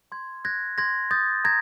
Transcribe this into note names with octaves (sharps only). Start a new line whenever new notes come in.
C6 G#6
F#6 G#6 A#6
C6 G#6 A#6
D#6 G6 A6
A#5 G#6 A#6